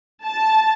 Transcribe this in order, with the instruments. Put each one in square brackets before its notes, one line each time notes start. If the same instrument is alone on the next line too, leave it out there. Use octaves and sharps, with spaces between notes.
[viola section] A5